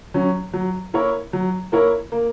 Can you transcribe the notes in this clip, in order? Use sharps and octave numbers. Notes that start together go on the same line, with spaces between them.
F#3 C#4
F#3
A#3 E4 A#4 C#5
F#3
A#3 E4 A#4 C#5
A#3